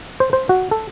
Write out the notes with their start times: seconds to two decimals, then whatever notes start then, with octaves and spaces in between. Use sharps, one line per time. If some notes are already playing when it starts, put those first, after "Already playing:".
0.20 C5
0.33 C5
0.49 F#4
0.71 A4